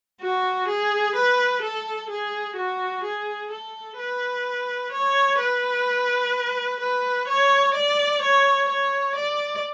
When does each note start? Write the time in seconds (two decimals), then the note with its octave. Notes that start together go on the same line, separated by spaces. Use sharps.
0.22 F#4
0.68 G#4
1.16 B4
1.62 A4
2.10 G#4
2.57 F#4
3.04 G#4
3.51 A4
3.98 B4
4.92 C#5
5.40 B4
6.80 B4
7.28 C#5
7.75 D5
8.22 C#5
8.69 C#5
9.16 D5